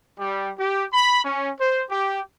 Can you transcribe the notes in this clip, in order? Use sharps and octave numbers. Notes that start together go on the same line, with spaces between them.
G3
G4
B5
C#4
C5
G4